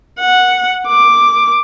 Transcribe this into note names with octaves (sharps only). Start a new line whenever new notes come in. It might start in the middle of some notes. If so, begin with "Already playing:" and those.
F#5
D6